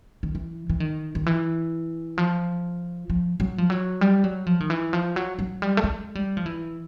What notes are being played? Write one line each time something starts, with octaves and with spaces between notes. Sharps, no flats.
D#3
E3
E3
D#3
D#3
E3
F3
F3
F#3
F3
F#3
G3
F#3
F3
D#3
E3
F3
F#3
F#3
G3
A3
G#3
G3
F3
E3